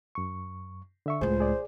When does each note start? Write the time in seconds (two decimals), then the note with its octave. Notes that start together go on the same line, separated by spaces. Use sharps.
0.15 F#2 C#6
1.06 D3 E5 C#6
1.21 C#2 A2 G#4 C5
1.40 G#4 D5